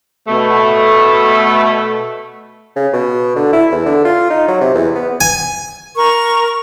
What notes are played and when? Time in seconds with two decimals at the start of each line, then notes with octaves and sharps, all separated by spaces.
0.28 B2 A3
2.76 C#3
2.93 B2
3.36 D3
3.53 E4
3.72 E2
3.86 D3
4.05 F4
4.30 D#4
4.48 F#3
4.61 C3
4.74 E2
4.95 B3
5.21 G#5
5.96 A#4 C#6